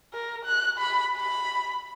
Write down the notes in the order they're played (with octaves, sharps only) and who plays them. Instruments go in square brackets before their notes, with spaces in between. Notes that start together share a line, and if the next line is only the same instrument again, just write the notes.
[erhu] A#4
F#6
B5
B5